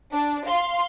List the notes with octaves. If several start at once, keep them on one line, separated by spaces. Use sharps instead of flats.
D4
F5 C6